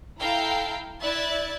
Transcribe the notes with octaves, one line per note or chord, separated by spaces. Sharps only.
E4 A4 F5 G5 A#5 C7
E4 D5 E5 F#6 G#6 A6